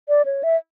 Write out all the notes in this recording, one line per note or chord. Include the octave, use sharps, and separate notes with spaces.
D5
C#5
E5